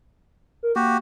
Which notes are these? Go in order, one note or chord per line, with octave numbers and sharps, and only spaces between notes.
A#4
A#3 F#4 G4